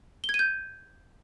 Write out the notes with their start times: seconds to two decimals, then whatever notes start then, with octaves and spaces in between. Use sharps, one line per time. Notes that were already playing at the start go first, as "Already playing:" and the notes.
0.24 G7
0.29 G#6
0.34 D#7
0.39 G6